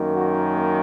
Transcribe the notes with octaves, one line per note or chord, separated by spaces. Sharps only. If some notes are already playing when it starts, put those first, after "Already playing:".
Already playing: F#2 D#3 A#3
F#4